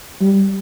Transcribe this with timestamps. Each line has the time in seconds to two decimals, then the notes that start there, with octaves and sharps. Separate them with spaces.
0.21 G3